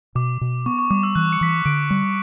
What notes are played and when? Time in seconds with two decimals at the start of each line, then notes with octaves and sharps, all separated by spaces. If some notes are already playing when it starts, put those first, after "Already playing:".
0.15 B2 D6
0.41 B2
0.66 B3 C#6
0.78 C#6
0.90 G3 D6
1.03 E6
1.15 E3 F#6
1.33 C#7
1.41 E3 B6
1.49 C#7
1.65 D3 D7
1.90 G3